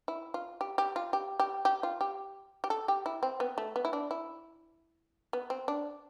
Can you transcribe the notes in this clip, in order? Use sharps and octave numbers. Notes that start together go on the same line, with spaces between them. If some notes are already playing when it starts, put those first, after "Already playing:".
E4
F4
G4
G4
F4
G4
G4
G4
F4
G4
G4
A4
G4
E4
C4
B3
A3
B3
E4
D4
E4
B3
C4
D4